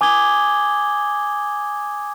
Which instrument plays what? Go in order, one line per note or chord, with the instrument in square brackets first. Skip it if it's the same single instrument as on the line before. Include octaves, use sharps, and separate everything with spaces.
[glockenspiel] G#5 D6 D#6 G#6 G7